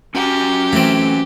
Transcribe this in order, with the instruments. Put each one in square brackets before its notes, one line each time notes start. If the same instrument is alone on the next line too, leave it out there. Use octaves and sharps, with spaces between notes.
[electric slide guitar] C#4 F#4 A#5 [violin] G4
[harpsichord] E3 C4 [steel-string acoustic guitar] A3